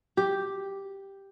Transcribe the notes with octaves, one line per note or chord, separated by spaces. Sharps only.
G4